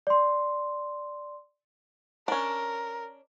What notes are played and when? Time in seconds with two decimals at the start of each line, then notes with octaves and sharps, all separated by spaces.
0.07 D5 C6
2.28 C#4 D4 A#4